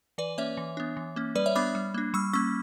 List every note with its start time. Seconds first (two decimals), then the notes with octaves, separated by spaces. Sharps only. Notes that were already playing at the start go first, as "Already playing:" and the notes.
0.18 E3 B4 D5
0.38 A#3 C#4 C#5 E5
0.57 E3
0.77 B3 D4
0.97 E3
1.16 A#3 C#4
1.35 G3 B4 D5
1.46 C#5 E5
1.55 B3 D4 B5 D6
1.75 G3
1.94 A#3 D4
2.14 G3 C#6 E6
2.33 A#3 C#4 C#6 E6